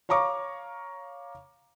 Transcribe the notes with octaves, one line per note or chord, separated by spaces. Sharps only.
C#5 F5 A#5 C#6 D6